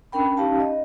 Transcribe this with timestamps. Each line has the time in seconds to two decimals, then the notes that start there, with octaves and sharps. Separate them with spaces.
0.12 C#4 D4 A#4 G5 B5
0.37 C#4 D#4 G4 F5 A5
0.60 D#5